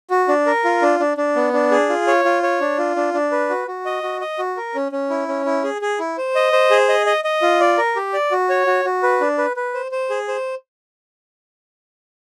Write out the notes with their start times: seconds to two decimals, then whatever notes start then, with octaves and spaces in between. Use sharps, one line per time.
0.10 F#4
0.28 D4
0.46 A#4
0.64 F4
0.82 D4
1.00 D4
1.17 D4
1.36 B3
1.53 D4
1.71 G#4
1.89 F4
2.07 C#5
2.25 F4
2.43 C#5
2.61 D4
2.78 F4
2.96 D4
3.14 D4
3.32 B4
3.50 F#4
3.68 F#4
3.85 D#5
4.03 F#4
4.21 D#5
4.39 F#4
4.57 A#4
4.75 C#4
4.92 C#4
5.10 E4
5.28 C#4
5.46 E4
5.64 G#4
5.82 G#4
5.99 E4
6.18 C5
6.35 D#5
6.53 C5
6.71 G#4
6.89 D#5
7.06 D#5
7.24 D#5
7.42 F4
7.60 D5
7.78 A#4
7.96 G4
8.13 D5
8.31 F#4
8.49 C#5
8.67 F#4
8.85 F#4
9.03 B4
9.21 D4
9.38 B4
9.57 B4
9.74 C5
9.92 C5
10.10 G#4
10.28 C5